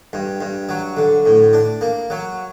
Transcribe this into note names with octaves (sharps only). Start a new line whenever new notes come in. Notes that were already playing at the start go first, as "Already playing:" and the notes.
G2
G2
F#3
D3
A2
D4
A#3
F#3